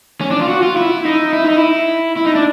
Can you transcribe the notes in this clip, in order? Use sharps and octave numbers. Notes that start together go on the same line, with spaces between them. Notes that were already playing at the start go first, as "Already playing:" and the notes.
C#4
D4
F4
F#4
F4
E4
D#4
E4
D#4
E4
E4
D#4
D4